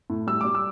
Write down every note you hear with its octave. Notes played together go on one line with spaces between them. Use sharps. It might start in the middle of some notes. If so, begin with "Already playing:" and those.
A2
G3 E6
G3 D6
E6